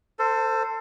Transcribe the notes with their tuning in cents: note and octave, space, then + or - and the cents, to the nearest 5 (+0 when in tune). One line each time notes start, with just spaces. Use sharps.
A4 +25 C5 -5